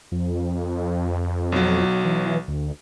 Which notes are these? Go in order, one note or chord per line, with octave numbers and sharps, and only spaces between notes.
F2
B1 F#3
E3
D2